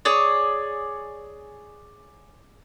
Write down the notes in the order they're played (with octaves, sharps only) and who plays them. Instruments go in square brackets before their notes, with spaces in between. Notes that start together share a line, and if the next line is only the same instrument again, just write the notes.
[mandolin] G#4 C#5 D5